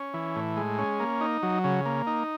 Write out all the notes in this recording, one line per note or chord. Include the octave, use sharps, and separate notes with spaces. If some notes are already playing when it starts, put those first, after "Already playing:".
Already playing: C#4
E3
A2
G#3
C#4
A#3
D#4
F#3
C#3
A#3
D#4